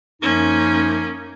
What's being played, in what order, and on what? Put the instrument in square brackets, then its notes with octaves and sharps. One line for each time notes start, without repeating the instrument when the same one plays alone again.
[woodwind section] F#2 F3 D#4 [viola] A#3 C#4